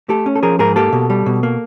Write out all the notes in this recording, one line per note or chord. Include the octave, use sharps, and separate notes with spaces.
A3 G4 A4
C#4
A4
F3 G#4 A#4
G#2 G#4 A#4
A#3 G4 A4
B2
G3
B2
A#3